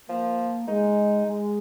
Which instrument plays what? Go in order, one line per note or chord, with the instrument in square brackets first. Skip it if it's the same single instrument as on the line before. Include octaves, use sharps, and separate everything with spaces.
[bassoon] F3 [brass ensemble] A#3
[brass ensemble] G#3 [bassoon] D#4
[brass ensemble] G#3